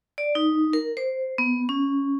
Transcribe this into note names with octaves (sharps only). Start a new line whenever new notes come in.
D5
D#4
A#4
C5
B3
C#4